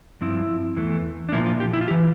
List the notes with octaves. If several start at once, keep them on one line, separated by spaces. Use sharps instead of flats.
G2 F3 C4 E4
E2 E3 A3
D4
A#2 F3 A#3 E4
F4
G4
E4
F4
G4
E3